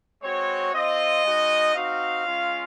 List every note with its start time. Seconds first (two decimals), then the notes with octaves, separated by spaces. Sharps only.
0.23 G#3 C4 F#4 C#5
0.73 C4 F4 D#5
1.24 G#3 D#4 F#4
1.74 C4 D#4 F#4 F5
2.25 G#3 C#4 F4